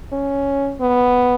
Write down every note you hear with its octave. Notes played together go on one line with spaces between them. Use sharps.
C#4
B3